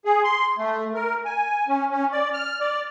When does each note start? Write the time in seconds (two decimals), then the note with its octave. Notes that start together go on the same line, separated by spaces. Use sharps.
0.05 G#4
0.24 C6
0.58 A3
0.94 A#4
1.25 G#5
1.68 C#4
1.91 C#4
2.12 D5
2.34 F6
2.61 D5